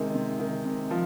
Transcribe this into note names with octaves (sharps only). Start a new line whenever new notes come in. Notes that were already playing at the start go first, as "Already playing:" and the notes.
Already playing: C3 D#3 G#3
C3
D#3
C3
F3